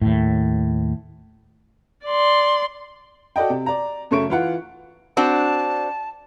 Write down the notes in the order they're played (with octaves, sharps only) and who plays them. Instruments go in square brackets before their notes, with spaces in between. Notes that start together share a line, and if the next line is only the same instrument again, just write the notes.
[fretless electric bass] D#2 A2
[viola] D5 C6
[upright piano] F#4 A4 D5 D#5 G5
C3
D5 A#5
F#2 C#3 A3 C#6 D7
E3 F4 F#5
[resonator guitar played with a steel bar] C4 D4 F#4 [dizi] A5